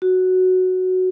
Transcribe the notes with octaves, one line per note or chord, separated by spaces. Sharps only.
F#4